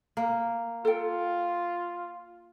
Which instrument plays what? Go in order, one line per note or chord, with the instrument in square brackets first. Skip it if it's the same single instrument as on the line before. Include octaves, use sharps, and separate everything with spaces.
[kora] A#3
[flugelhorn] F4 [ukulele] A4 G5